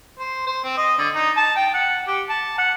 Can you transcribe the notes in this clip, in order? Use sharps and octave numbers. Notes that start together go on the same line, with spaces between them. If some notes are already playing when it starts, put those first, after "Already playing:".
C5
C5
C4
D#5
D3
D#4
A5
G5
F#5
G4
A5
F#5